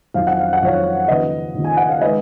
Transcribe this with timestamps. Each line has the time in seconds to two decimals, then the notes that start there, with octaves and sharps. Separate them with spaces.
0.14 F2 D#3 F#3 F5
0.27 F#5
0.39 F5
0.53 F#5
0.61 F2 D#3 F#3 C#5 F5
1.08 D#2 C#3 F3 B4 D#5
1.55 D#2 C#3 F3
1.64 G#5
1.77 F#5
1.89 F5
2.01 D#3 G#3 B4 D#5